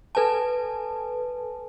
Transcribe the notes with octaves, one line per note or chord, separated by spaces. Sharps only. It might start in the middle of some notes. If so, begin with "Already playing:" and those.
A4 B4 G#5 A5